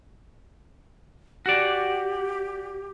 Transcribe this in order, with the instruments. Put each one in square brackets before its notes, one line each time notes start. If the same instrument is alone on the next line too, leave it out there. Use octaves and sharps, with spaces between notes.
[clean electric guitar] F#4 D5 [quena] G4